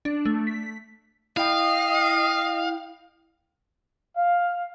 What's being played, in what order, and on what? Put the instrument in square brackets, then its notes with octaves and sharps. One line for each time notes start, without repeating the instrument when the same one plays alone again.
[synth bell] D4
A3
B6
[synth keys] E4 G5 [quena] D#5 [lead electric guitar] F5
[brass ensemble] F5